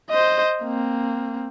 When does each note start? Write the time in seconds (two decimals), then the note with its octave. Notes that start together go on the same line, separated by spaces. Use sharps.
0.10 C5 D#5
0.63 A#3 C4